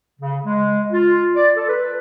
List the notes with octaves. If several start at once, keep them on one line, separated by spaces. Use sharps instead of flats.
C#3
G#3
F4
D5
A4
B4